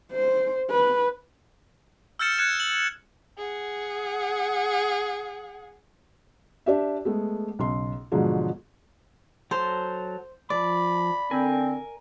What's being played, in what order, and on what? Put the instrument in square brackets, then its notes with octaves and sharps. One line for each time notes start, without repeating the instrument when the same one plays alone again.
[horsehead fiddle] C5
B4
[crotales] E6 F6 G6 A6 C#7 E7
F#6 G#6 C#7 E7
F#7
[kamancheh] G#4 F#5
[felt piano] D4 G4 E5
G#3 A3 B3
B1 C#3 C6
G#2 B2 D3 F3 F#3 G#4
[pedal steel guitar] F#3 A4 A#5 [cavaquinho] C5
[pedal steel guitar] F3 D6 [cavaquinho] D5 [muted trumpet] B5
[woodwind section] D3 C4 [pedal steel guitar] A#4 G#5